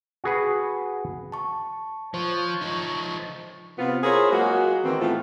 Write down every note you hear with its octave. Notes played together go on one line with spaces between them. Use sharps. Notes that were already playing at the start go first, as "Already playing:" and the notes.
F#4 G#4 B4
A5 C#6
F3 C5 C#5
F3 D#4
C3 B3 F4
E4 F4 G#4 A#4 C5 C#5
F#3 G#3 A#3 F4 F#4
D#3 E3 C4
A2 E3 A3 B3 F4